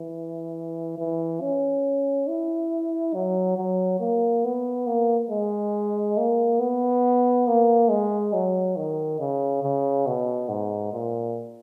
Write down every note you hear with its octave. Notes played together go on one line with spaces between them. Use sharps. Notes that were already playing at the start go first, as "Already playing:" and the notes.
Already playing: E3
E3
C#4
E4
F#3
F#3
A#3
B3
A#3
G#3
A#3
B3
A#3
G#3
F#3
D#3
C#3
C#3
B2
G#2
A#2